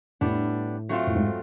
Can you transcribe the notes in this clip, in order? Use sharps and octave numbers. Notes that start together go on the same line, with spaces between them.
A2 G3 B3 D4
F#3 A3 C4 F4
A2
G#2